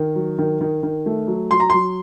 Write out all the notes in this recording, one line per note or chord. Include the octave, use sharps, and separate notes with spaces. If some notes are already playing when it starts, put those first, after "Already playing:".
Already playing: D#3
F#3
D#3
D#3
D#3
A3
F#3
F#3 C6
A#5
F#3 C6